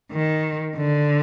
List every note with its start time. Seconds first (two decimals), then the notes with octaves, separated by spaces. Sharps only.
0.11 D#3
0.76 D3